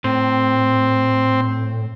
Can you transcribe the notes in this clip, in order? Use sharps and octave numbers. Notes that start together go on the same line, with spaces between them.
A2 C4